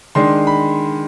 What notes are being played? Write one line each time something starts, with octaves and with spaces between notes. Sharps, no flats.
D#3 G#3 D4 C6
B5